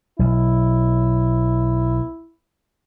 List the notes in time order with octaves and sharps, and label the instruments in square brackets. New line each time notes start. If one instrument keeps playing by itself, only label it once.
[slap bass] B1 [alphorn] E4